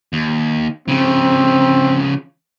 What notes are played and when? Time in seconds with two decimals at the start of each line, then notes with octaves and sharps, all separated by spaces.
0.13 D#2
0.88 C#3 F3 C4